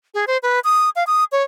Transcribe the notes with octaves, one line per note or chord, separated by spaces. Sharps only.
G#4
C5
B4
D#6
F5
D#6
C#5